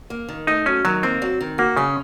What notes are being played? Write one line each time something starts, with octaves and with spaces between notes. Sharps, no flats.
A#3
D#3
A3 D#4
F#3 C#4
D#3 F#3
A#3 C4
F#3
D#3
A#3 F#4
C#3 C#4